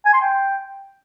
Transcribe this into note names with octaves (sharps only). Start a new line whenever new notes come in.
G#5
C6
G5